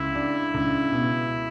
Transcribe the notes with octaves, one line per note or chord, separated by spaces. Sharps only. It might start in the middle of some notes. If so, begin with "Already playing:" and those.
Already playing: C#2 E4
D4
C#2
B2